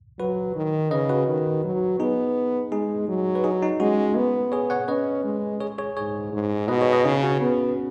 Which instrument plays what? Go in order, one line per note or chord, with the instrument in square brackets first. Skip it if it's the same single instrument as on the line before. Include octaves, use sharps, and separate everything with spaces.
[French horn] F#3 [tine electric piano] F#4 B4
[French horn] D#3
[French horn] C#3 [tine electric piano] B4 D#5
[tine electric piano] F#4 B4
[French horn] D#3
F#3
[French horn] B3 [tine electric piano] D#4 G#4
[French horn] G#3 [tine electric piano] D#4 G#4
[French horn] F#3
[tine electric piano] B4
D#4 G#4
D#4
[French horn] G#3 [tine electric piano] C#4 F#4
[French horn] B3
[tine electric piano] G#4 C#5
C#5 F#5
[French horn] C#4 [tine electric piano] B4 D#5
[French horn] G#3
[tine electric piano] G#4 C#5
G#4 C#5
[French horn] G#2 [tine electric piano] G#4 C#5
[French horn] G#2
[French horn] B2 [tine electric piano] B4 D#5
[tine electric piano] G#4 C#5
B4 D#5
[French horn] C#3 [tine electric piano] D#4 G#4
[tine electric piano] C#4 F#4
[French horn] B3